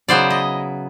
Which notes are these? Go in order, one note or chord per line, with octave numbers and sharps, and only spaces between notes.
C#3 F#3 B3 E4 C5 D5
D#5